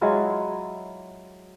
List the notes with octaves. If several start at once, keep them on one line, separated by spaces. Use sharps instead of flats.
F#3 G#3 E4 F4